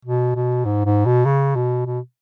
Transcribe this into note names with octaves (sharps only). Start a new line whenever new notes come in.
B2
B2
G#2
G#2
B2
C#3
B2
B2